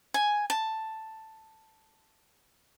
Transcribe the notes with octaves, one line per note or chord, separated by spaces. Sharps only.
G#5
A5